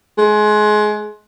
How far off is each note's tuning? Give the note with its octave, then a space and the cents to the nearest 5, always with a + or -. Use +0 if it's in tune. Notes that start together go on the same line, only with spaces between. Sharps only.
G#3 +25